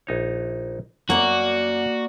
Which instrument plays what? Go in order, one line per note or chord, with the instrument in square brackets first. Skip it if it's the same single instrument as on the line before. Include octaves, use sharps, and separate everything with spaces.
[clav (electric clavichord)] A#1 D#4 C#5
[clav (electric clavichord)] F#2 [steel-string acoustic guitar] A#3 D5 [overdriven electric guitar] F#4